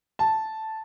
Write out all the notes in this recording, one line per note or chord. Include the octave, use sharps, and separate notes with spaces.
A5